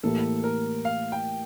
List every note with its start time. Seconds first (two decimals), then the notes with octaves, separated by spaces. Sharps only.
0.03 A2 E3 A#3 E4 G4 A4
0.44 A#4
0.85 F5
1.12 G5